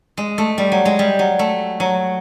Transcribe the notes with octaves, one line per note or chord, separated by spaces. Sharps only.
G#3
A3
G3
F#3
G#3
G3
F#3
A3
F#3